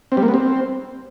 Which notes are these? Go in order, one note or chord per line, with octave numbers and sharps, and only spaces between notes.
C4
G3
A#3
B3
C4